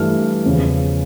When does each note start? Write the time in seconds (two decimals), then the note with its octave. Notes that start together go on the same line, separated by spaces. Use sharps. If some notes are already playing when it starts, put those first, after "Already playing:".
Already playing: G2 E3 A3 F6
0.45 E2 C#3 F3